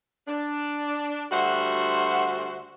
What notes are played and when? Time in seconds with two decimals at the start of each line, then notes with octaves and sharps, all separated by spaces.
0.28 D4
1.32 D2 G3 F#4 C5 E5 F#5